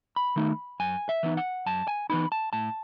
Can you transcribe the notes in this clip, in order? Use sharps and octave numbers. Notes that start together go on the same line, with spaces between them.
B5
D#3 A3 D#4
F#2 G#5
E5
E3 B3 D#4
F#5
F#2 A5
G#5
E3 B3 D#4 B5
A5
A2 A5